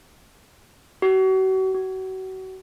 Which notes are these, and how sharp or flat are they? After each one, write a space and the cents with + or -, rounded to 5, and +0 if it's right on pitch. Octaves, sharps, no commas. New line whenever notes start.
F#4 +40
F#4 +35